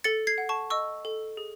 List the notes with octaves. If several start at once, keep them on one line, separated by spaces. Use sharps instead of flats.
A4 A6 C#7
G#6 C7
F#5
A5 C#6
D#5 C#6 E6
A4
G#4